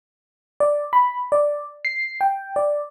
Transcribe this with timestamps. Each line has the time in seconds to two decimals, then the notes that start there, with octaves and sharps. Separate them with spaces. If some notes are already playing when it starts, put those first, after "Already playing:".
0.60 D5
0.93 B5
1.32 D5
1.85 C7
2.21 G5
2.56 D5